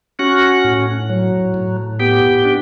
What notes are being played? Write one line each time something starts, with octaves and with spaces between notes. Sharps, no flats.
C#4 F#4 F#5
A2
F#3
A2
B3 G4 G5
D4